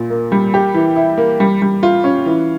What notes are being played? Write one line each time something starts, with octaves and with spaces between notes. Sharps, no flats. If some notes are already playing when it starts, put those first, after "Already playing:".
Already playing: A#2
A#3
G3
G4
E3
E4
A#3
G3
G3
F4
C#4
E3